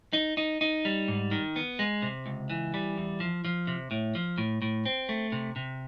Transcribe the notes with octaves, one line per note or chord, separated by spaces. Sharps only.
D#4
D#4
D#4
G3
G#2
D#3
B3
G#3
C3
C#2
E3
G3
E2
F3
F3
C3
A2
F3
A2
A2
C4
A3
C3
C3